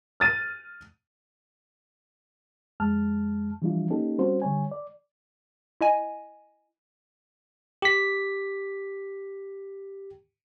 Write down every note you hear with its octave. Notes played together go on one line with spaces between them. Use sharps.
F6 A6 D#7
F2 G#3 A5 F6
E3 F3 G3 D4 E4 F4
A#3 C#4 D#4 G4 A4
G3 C4 C#4 F#4 C5
D3 G3 C#5 G#5
D5
E4 D#5 G#5
G4 B6